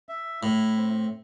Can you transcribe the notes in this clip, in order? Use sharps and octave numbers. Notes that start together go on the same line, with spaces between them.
E5
A2 E4
C4